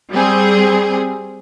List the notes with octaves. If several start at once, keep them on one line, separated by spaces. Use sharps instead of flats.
G3 C4 G#4